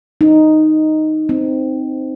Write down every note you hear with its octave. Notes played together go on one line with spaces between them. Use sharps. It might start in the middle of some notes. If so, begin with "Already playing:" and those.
D#4
C4